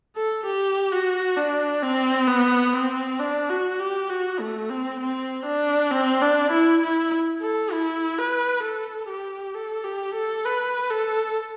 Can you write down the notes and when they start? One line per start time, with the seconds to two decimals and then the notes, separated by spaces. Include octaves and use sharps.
0.16 A4
0.46 G4
0.92 F#4
1.37 D4
1.83 C4
2.28 B3
2.74 C4
3.19 D4
3.49 F#4
3.79 G4
4.09 F#4
4.40 A3
4.70 C4
5.00 C4
5.46 D4
5.91 C4
6.22 D4
6.51 E4
6.82 E4
7.41 A4
7.72 E4
8.18 B4
8.63 A4
9.08 G4
9.54 A4
9.84 G4
10.14 A4
10.45 B4
10.90 A4